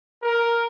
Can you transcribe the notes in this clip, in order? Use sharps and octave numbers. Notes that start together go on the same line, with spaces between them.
A#4